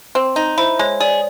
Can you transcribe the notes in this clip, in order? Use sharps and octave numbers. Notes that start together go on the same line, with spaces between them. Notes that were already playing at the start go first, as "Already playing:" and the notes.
C4
D#4
E4 C5
G#3 C#5
G#4 D5